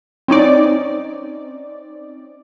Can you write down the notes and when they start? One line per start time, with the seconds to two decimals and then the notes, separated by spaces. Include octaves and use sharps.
0.28 C4 C#4 D#4 D5